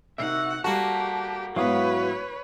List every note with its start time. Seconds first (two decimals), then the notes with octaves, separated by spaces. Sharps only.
0.18 C3 A#3 D#4 F#4 E5 F#5
0.64 G3 A#3 F#4 G4 A4 A5
1.56 G#2 F#3 B3 E4 B4 C#5 F5 D#6